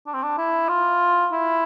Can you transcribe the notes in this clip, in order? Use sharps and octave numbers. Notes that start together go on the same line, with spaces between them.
D4
C4
D4
E4
F4
E4